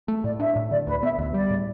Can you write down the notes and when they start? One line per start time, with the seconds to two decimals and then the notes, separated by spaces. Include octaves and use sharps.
0.08 A3
0.24 A2 D5
0.40 D4 E5
0.56 A2
0.71 D3 D5
0.87 D2 B4
1.03 B3 E5
1.18 D2 E5
1.34 G3 D5
1.50 A2